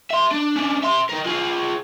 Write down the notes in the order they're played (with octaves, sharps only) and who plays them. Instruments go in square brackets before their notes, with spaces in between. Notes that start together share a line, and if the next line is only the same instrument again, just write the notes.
[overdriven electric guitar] E5 C6
D4
C#4 D4
E5 C6
D#3 A#4
F4 G#4